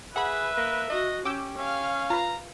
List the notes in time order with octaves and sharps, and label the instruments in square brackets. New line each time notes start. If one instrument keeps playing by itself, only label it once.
[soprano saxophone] G#4 [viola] B4 [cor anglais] E5 [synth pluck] F#5 B5
[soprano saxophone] A#3
[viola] F#4 [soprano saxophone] D#5
[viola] C#4 [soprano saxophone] G4 [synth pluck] D6 E6 G6
[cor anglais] C#4 [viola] F5
[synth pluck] F4 B4 [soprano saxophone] A#5